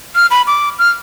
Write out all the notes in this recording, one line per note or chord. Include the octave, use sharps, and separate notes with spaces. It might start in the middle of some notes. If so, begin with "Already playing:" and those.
F6
B5
D6
F6